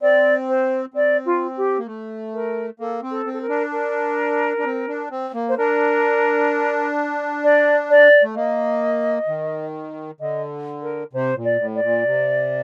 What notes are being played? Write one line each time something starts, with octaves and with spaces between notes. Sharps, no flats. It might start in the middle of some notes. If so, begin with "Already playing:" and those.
C4 D5
C5
C4 D5
F4
G4
A#3
A3
A#4
A#3 A4
C4
A4
C4
A4
A#4
D4
A#4
D4
C4
D4
C4
A#3
C5
D4 A#4
D5
D5
A3
A#3 D#5
D#3
D3 D#5
A#4
C3 C5
A#2
D5
A2
D5
A#2
C3